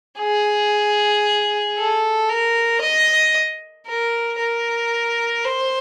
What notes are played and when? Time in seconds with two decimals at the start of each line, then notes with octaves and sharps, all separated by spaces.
0.19 G#4
1.77 A4
2.29 A#4
2.81 D#5
3.87 A#4
4.39 A#4
5.45 C5